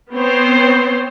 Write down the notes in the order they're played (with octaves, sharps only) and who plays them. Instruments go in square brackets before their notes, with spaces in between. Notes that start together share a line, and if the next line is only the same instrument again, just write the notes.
[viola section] B3 C4 C5 C#5